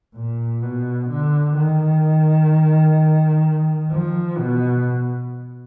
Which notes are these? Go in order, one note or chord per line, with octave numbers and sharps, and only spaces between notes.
A#2
B2
D3
D#3
F3
B2